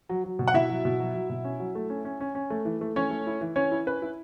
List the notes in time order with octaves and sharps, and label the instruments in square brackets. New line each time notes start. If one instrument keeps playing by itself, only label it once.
[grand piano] F#3
F#3
B2
F#5
B2 E4 E5
F#3
B2
F#3
F#3
B2
C#4
F#3
A3
C#4
C#4
C#4
C#4
A3
E3
A3
E3 C#4 C#5
A3
E4
E3
E3 C#4 C#5
E4
C#4 B4
E4